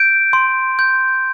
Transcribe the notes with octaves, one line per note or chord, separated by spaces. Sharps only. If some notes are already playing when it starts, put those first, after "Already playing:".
Already playing: G6 D7
C6
G6